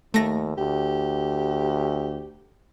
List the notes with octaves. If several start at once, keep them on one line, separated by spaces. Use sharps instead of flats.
D#2 A3 A#6
D2 G4